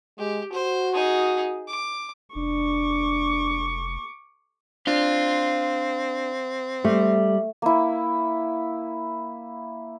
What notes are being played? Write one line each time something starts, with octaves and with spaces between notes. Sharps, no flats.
G#3 G4
F#4 C5
D#4 G#4
D6
F1 D4 C#6 D6
C4 D4 F5 C6
G3 A3
A#3 E4